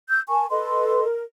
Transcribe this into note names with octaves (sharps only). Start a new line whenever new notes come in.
E6 G6
A#4 G#5 A5 C#6
A4 B4 D#5 C6
A#4